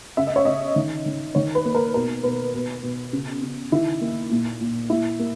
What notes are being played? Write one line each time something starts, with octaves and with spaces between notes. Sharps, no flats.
C#3 E5
D#5
C#5
C#3 D#5
D#3
D#3
D#3 C#5
B4
A#3
A#4
B2 A#4
B2 B4
B2
B2
C#3
C#3
D#3 E4
A#3
A#2
A#2
A#2 E4
A#3